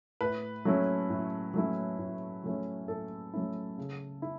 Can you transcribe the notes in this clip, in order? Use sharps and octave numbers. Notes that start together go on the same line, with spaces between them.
A2 B4
F#3 A3 C#4 E4
A2
F#3 A3 C#4 E4
A2
F#3 A3 C#4 E4
A2 A4
F#3 A3 C#4 E4
C#3
E4